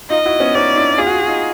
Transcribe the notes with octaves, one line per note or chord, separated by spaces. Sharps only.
D#4 F4 D#5
E4 F#4
B3 C#4
C#4 D#4 D5
D4 E4
F4 G#4
F#4
F4
F#4
D#4 F4